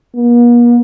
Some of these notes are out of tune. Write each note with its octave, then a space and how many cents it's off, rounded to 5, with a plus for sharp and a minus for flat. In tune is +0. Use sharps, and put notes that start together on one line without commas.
A#3 +45